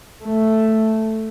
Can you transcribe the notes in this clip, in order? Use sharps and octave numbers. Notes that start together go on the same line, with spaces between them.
A3